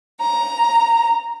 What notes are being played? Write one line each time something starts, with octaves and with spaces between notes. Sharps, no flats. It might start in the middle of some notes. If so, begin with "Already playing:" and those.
A#5